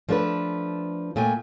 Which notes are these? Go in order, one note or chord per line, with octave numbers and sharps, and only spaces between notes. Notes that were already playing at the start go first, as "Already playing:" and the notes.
F3 A3 D4 A4 B4
A#2 A3 G5 G#5